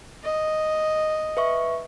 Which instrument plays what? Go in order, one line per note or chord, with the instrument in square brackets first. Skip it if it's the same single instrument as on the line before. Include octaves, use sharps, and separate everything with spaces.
[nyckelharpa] D#5
[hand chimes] B4 E5 C#6